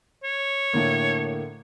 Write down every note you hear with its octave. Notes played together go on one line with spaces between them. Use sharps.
C#5
A2 D3 A#3